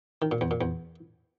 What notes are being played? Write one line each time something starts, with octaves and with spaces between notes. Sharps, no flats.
D#3
A#2
E2
A#2
E2